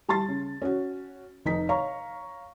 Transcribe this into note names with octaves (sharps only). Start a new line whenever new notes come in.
G3 A5 C6 A6
C#3
C#4 F#4
F1 D#4 B6
C#5 F5 A#5 C#6